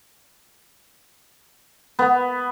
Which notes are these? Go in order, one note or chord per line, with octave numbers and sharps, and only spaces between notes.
B3